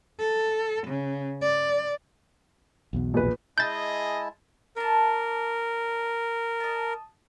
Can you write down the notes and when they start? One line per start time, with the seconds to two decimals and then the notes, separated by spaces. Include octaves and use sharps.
0.19 A4
0.87 C#3
1.41 D5
2.93 B1 E2 B2
3.14 A#1 B4
3.58 G#3 E4 G#4 D#5 A5 G6 A6
4.76 D4 A#4 A5
6.60 D#5 A5